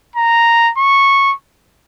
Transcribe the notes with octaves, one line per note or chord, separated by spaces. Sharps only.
A#5
C#6